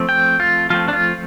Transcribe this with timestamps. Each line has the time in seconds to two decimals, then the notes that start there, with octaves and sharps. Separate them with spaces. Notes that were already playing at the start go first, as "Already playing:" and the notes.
Already playing: F3 A3 C4
0.09 G5
0.40 F4
0.70 F3 A3 C4 F4
0.88 D4
0.93 F4